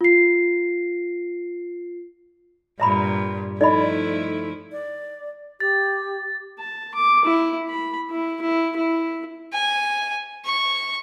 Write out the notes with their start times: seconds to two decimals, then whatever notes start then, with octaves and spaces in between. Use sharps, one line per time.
0.01 F4 C7
2.80 G2 A#2 E5 A#5 B5
3.61 F3 A3 D#4 E4 A4 D5 D#5 B5
4.72 D5
5.60 G4 A6
6.59 A5
6.95 D6
7.25 E4
7.69 B5
8.10 E4
8.42 E4
8.76 E4
9.53 G#5
10.45 C#6